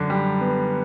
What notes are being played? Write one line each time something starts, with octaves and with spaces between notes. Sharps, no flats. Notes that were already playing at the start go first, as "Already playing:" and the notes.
Already playing: F#2 D3
G3
B3